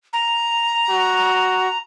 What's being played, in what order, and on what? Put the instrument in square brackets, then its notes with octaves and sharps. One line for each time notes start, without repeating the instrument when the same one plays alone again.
[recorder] A#5
[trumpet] F#4